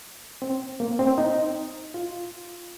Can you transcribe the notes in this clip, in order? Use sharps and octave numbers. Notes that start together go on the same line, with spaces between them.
C4
A#3
C4
D#4
F4